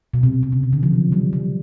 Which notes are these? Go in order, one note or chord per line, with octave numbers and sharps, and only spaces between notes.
B2
C3
B2
C3
C#3
C#3
D3
F3
F#3
G3
G3